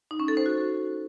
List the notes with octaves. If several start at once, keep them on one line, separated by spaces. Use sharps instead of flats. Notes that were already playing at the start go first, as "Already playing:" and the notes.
D#4
C#4
A4
C5
F#4